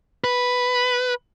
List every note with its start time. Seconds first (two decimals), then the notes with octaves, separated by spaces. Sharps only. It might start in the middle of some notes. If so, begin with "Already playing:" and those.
0.24 B4